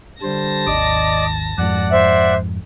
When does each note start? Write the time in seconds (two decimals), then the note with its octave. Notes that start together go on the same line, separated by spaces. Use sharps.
0.23 D3 G3 C5 A5 A#6
0.67 G#1 D#2 D5 D#5 D6
1.58 F2 G#2 D5 F#5
1.91 C5 E5